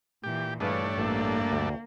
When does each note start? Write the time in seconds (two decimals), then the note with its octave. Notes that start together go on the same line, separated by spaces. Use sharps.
0.24 A#2 E3 G4
0.60 G2 E3 A3 D4 G#4 B4 C#5 F5
0.98 A1 A#3 A4 A5
1.52 D2